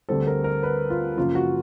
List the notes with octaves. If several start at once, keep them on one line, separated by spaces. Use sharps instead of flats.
D2 D3 G3 C4 A4
A#4
A#4
B4
F4
F#2 C#3 F3 A#3 F4
F#4